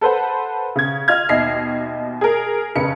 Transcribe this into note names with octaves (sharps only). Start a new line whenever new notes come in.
A4 B4 C5 F#5
C#3 G#6
F4 D#5 F6 G#6
D#2 B2 D#5 E5 C7
G#4 A#4
F1 C#3 B4 C#7